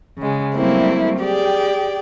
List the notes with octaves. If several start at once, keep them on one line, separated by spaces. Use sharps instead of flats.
C#3 G#3
F#3 G3 A3 A#3 C4 E4
G4 G#4 D5 G5